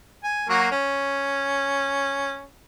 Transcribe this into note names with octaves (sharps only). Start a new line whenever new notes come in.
G#5
F#3 A#3 F#4
C#4